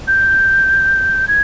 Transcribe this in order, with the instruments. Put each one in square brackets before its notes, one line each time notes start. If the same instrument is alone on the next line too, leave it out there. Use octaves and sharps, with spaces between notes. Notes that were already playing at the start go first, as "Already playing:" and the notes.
[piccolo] G6
G#6